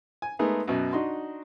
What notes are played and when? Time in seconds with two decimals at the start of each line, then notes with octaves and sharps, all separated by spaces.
0.22 G#5
0.39 G#3 A3 B3 D#4 G#4 A#4
0.68 F#2 B2
0.93 D4 D#4 F#4 D#5 C6